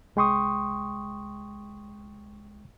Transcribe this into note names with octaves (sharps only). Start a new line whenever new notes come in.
C2 G#3 G5 C6 C#6 D#6